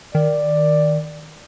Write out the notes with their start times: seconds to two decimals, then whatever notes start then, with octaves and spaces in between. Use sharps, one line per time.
0.15 D#3 D5